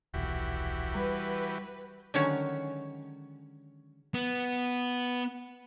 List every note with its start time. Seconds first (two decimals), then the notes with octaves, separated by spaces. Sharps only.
0.14 D#1 B1 E3 F#4 G4
0.95 G3 B4
2.14 D3 D#3 F#3 G#3 C#4 C#5
4.14 B3